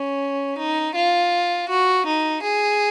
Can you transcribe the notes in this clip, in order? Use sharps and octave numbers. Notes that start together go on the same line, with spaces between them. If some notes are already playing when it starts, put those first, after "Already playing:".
Already playing: C#4
D#4
F4
F#4
D#4
G#4